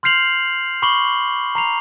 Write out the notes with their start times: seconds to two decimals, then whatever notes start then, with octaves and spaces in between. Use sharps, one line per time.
0.03 C6 F6 G6 C7 F7 F#7
0.82 B5 C#6 D6 C7 F#7 G7
1.55 A#5 C7 F7